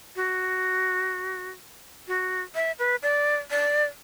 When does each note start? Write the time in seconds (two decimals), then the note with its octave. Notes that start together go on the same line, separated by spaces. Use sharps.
0.16 F#4
2.08 F#4
2.55 E5
2.79 B4
3.03 D5
3.51 D5